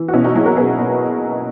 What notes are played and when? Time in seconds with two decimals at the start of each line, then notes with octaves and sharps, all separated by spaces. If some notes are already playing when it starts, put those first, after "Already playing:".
Already playing: E3
0.08 F#4
0.13 B2 C#4 E4
0.24 D#4 F#4
0.35 F#3 E4 G#4
0.46 F#4 A#4
0.57 B2 G#4 B4
0.79 B2